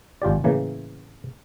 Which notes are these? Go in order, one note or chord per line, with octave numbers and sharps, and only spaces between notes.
G#1 F4 G4 D5
A2 C#3 E3 A#3